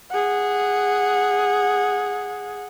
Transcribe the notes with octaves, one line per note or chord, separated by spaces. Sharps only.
G#4 F#5